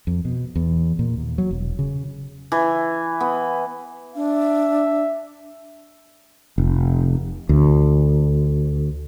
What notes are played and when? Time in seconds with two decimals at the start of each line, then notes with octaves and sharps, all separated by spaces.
0.07 F2
0.25 B2
0.56 E2
0.99 A#2
1.17 D#2
1.38 F#3
1.51 E1
1.79 C#3
2.52 E3
3.20 B3
4.16 D4 E5
6.58 F1
7.49 D2